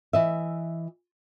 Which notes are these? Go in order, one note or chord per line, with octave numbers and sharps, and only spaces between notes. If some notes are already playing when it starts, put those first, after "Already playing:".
E3 D#5 E5